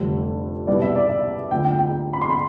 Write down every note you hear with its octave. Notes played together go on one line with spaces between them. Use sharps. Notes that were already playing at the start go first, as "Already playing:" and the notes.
Already playing: F1 F2 D3 G3
C2 B2 G3 C4 E4 D5
E5
D5
E5
D2 D3 F3 G5
G5
G5
B5
C6
B5